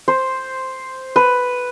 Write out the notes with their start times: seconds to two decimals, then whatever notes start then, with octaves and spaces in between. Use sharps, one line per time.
0.08 C5
1.16 B4